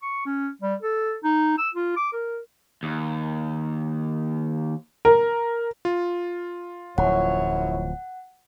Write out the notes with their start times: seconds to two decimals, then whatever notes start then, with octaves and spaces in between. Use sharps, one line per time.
0.02 C#6
0.26 C#4
0.62 G3
0.82 A4
1.24 D#4
1.58 E6
1.74 F4
1.96 D6
2.13 A#4
2.83 D#2
5.05 A#4
5.85 F4
6.98 D1 F#2 F3 E4 C#5 F#5